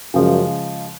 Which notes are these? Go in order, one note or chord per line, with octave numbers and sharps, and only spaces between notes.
F#2 C#3 F3 G#3